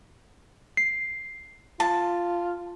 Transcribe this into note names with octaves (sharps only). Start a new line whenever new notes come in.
C7
F4 A5